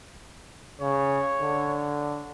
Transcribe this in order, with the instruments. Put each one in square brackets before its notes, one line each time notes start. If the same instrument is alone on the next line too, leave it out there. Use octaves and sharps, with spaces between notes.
[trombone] C#3 [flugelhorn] C#5
[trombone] D3